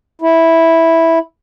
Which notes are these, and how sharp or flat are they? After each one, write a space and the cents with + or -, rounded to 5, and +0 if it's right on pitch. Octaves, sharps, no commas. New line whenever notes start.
E4 -5